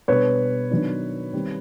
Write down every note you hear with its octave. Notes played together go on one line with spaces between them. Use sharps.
B2 G3 B3 D4 B4 C#5
D#3 F#3 B3 D4
D#3 G3 C4